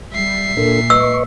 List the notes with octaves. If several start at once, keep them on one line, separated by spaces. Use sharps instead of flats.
G3 E5 C7
A#2 D4 A4 A#4
B4 D#5 C#6 E6